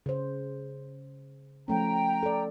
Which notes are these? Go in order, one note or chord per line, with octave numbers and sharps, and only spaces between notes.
C#3 C5
F3 A3 C#4 G5 A#5
A4 D5